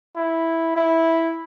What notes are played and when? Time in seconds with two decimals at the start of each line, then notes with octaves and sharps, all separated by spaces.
0.16 E4
0.76 E4